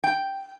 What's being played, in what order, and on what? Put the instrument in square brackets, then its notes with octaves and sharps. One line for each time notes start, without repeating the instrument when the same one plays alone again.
[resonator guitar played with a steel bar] G5